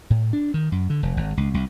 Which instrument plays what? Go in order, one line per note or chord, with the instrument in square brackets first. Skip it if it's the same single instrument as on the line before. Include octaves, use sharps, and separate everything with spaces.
[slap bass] A2
D4
D#3
F#2
D3
F1
G#1
C#2
C2